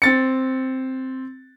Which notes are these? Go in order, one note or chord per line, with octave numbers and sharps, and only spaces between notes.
C4 A6 C#7